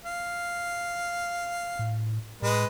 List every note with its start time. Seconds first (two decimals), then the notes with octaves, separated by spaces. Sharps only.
0.04 F5
1.79 A2
2.42 A2 G#3 B4 D#5